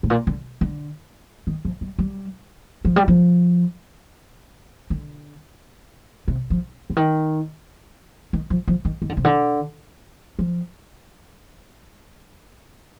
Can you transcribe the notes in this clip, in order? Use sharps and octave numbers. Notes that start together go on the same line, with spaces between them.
A2
A#2
D3
D3
D#3
F3
G3
G3
F3
G3
F3
D3
C3
F3
D3
D#3
D#3
F3
F3
D#3
D#3
D3
C3
D3
F3